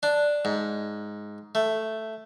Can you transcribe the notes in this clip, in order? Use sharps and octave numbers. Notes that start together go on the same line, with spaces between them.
D4
G#2
A3